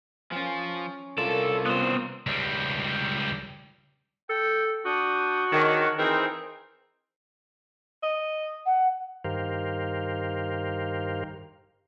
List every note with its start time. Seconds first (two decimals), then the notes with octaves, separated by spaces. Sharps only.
0.32 F3 C#4 F4 G#5
1.18 C2 F4 A4 A#4 D5 F5
1.66 B3 F4 C5
2.27 C#2 G3
4.30 A4 G5
4.85 D4 F#4 D#6 G6
5.52 D#3 D4 G#4 C#5
5.98 E3 C4 D#4 G#4 A#4 G5
8.03 D#5
8.66 F#5
9.24 G2 D#3 G4 A#4 C5 F5